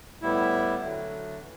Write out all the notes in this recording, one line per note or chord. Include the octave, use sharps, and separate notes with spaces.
A2 G3 B3 E4
D2 D3 F#3 A3
E3